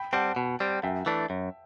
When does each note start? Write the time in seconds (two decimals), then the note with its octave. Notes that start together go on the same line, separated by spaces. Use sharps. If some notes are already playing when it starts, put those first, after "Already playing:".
Already playing: G5 B5
0.13 G3 C4 F#5 A5
0.36 B2
0.60 G3 C4
0.83 F#2 E5 G5
1.06 E3 A3 D4
1.30 F#2